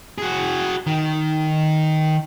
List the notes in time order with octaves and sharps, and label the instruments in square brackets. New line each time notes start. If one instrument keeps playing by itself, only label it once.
[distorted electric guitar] F#4 G#4
D#3